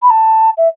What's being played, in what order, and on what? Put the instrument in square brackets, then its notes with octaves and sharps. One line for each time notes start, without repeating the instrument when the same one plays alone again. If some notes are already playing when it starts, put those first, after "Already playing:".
[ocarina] B5
A5
E5